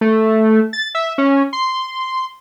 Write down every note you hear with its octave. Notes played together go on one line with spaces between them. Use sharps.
A3
A6
E5
C#4
C6